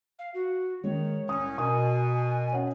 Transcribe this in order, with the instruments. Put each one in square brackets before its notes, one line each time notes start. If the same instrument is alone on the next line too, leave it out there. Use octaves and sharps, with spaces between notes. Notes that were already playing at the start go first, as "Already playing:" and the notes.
[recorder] F5
F#4
[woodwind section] D#3 [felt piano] G#3 [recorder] C#5
[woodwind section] C2 A2 C#4 [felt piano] D#6
[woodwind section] B2 [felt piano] A#4 D#6 [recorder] G#5
[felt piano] C#4 F#5